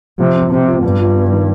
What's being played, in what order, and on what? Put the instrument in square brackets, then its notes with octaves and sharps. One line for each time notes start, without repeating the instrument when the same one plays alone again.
[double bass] C3 [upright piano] F3
[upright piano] C4
[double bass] C3 [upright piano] C4
[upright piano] F4
[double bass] G2 [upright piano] B3
[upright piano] F4
B3
D#3